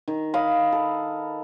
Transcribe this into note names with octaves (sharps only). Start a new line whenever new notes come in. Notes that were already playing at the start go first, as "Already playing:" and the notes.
D#3
D#5 F5 B5
A4